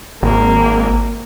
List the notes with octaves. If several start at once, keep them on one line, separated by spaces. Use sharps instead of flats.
G#1 A#3